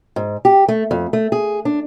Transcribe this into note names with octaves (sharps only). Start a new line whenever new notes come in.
G#2
G4
A3
F2
A3
G#4
D4